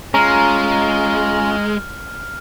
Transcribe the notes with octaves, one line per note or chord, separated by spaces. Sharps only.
G#3 C#4 F4 A#5 F6